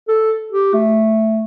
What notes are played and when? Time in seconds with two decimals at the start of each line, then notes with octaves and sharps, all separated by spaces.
0.08 A4
0.52 G4
0.74 A3